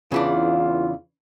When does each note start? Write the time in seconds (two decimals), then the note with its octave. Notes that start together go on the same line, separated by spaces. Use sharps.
0.12 E2 C#3 E3 D4 F4